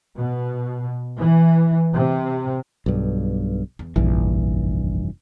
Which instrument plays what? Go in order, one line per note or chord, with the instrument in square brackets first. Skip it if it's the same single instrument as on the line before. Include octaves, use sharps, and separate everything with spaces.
[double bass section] B2
E3
C3
[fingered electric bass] B1 G2
[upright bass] E2
[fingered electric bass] F1 G2 E3 [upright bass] A#1